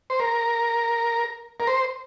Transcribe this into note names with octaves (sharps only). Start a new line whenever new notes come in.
C5
A#4
A#4
C5